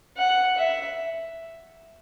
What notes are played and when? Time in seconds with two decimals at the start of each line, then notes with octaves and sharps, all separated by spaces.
0.17 F#5
0.57 E5